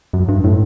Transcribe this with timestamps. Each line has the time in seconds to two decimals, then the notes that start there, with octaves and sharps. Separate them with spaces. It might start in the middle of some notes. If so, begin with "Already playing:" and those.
0.13 F#2
0.28 G2
0.44 A2